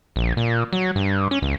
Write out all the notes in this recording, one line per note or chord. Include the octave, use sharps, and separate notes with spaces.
A#1
A#2
F#3
G2
C#4
C#2